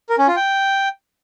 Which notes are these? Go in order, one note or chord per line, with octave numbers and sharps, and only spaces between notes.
A#4
C#4
F4
G5